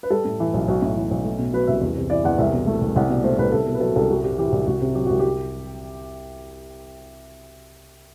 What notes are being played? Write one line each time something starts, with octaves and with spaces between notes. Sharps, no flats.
B4
G3 A4
A2
E3
B1
B1 F#4
A2
E3
B1
A3
B2
F#3 B4
C2 E5
E2
C3
E3 D5
E2 F#5
C2 E5
B2
A3
C2
C2 F#5
B2 D5
A3 C5
C2 B4
C2 A4
B2
B4
F#3 A4
C2 A4
G3 F#4
C3 G4
E3 G4
F#4
C2
C2 F#4
C3
F#3 G4
C2 F#4
G4